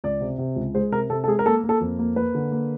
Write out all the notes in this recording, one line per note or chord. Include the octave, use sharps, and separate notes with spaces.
C#2 D5
C3
C3
C#2
G#3 C5
C3 A#4
C3 A4
A4
G#3 G#4
A#4
A#3 A4
A#3
A4
F2
A#3
A#3 B4
D3
A#3